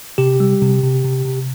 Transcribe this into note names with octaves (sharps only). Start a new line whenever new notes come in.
C3 G4
G3
C3
C3
C3
C3